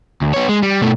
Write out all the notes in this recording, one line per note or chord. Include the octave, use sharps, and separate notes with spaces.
D2
B3 C#5
G#3
G3
B2 A3